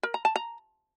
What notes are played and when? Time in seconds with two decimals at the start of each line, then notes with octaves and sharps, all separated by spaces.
0.03 A#4
0.14 A#5
0.25 A5
0.36 A#5